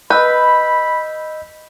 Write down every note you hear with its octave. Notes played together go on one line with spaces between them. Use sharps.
B4 D#5 B5 E6 G6